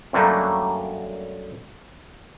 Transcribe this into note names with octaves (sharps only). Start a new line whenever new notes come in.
F#2 D3 F#3 G3 A3 A#3